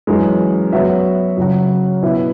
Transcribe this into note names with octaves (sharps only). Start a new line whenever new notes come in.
F#2 E3 G#3
F#3 B3 F#4 E5
F#2 C#3 F#3
B2 B3 E4 B4 E5